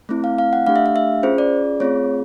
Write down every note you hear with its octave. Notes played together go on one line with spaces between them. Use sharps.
A3 C4 E4
F5
F5
F#5
A3 D4 G4 F5
E5
F5
E5
C#4 F4 G#4 C5
D5
A3 C4 F4 G#4 C#5